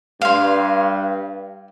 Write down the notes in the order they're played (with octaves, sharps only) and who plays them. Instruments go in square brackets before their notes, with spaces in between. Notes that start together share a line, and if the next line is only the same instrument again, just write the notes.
[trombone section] G2 [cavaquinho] F5 C6